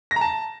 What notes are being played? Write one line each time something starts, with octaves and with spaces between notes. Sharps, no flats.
A#6
A#5
A5